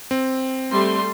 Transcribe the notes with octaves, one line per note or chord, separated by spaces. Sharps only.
C4
G3 A3 C6